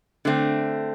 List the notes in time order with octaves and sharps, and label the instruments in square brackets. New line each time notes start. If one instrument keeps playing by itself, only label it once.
[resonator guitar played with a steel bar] D3 A3 C4